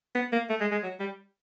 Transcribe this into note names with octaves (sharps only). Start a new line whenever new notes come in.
B3
A#3
A3
G#3
G#3
F#3
G3